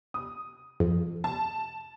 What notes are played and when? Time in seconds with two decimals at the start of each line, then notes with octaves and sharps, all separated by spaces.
0.14 D#6
0.80 F2
1.24 A5